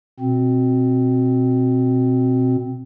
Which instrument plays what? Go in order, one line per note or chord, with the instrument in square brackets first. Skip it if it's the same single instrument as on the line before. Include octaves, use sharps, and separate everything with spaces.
[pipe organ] B2 C4